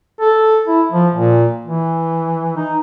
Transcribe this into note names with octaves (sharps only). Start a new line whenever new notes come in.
A4
E4
F3
A#2
E3
D#4